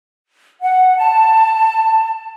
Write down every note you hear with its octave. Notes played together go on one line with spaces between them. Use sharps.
F#5
A5